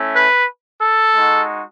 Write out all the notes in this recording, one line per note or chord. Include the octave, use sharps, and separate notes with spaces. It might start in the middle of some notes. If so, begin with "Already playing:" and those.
Already playing: A3 C#4 E4
B4
A4
G#3 D#4 F#4